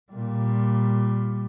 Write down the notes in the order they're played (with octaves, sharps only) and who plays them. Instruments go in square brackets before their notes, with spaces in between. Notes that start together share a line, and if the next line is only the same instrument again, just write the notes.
[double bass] A#2 G3